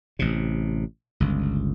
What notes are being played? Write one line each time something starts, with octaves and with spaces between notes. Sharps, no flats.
A1 C3
G1 C#2